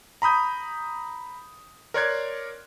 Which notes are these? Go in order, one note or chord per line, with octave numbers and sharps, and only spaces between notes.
A#5 B5 D#6 G6
A#4 C#5 D5 C6 F#6 G#6